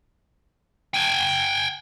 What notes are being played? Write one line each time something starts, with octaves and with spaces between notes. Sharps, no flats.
G5 G#5